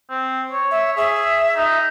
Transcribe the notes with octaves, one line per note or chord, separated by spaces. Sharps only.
C4
C#5
E5
G#4 E5
D#4